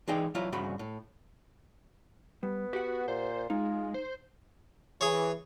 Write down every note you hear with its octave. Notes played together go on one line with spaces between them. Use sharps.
E3 G#3 D#4 G#4 D5 G5
C2 F#3 E4 F4
C2 G2 C#3 F#4 B5
A2
G3 B3
F#4 G4 F#5
A#2 C5
G#3 D#4 F4
C5
E3 G#4 C#5